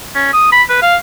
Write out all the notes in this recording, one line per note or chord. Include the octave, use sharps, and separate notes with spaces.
C#4
D#6
B5
B4
F5